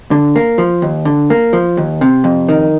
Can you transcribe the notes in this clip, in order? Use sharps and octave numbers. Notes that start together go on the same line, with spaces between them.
D3
A#3
F3
D#2
D3
A#3
F3
D#2
C3
F2
D#3